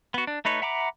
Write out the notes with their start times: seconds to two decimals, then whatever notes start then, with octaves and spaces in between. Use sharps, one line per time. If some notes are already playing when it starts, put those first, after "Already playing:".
0.14 B3 F#4
0.27 D4
0.45 A3 D#4 B4 C#5
0.62 E5 F#5 A#5 B5 D6